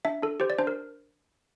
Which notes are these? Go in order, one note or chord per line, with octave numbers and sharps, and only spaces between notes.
D4 E5
D4 A4
G4 C5
D5
D4 C5
A#4